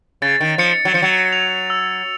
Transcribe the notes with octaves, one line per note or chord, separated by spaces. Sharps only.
C#3 A6
D#3
F3 C#7
F#3
F3 C#7
F#3
F7
E6